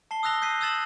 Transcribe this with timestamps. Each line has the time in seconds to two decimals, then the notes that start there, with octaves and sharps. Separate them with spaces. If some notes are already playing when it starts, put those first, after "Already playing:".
0.11 A5 C7 G7
0.23 D#6 E6 F#6 A#6 F7 G7
0.42 D#6 G6 B6 C7 D#7
0.61 D#6 E6 G6 A6 E7 F#7